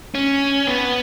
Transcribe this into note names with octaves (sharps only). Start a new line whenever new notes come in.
C#4
B3